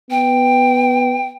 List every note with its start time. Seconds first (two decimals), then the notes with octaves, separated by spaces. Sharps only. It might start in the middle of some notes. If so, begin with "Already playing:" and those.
0.11 B3 G5